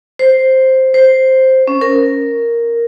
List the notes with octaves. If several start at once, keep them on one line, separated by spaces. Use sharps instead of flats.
C5
C5
C#4
A#4